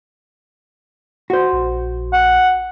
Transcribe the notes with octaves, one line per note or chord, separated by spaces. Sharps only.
F#4 C5
A#1
F#5